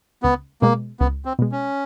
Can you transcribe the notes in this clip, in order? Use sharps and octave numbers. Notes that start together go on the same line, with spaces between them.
C#2 B3
B2 G#3 A#3
C#2 B3
C4
B2 G#3
C#4